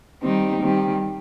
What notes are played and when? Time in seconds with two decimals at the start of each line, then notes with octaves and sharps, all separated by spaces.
0.21 D#3 G3 C4 D#4 G4
0.60 D#3 G3 C4 G4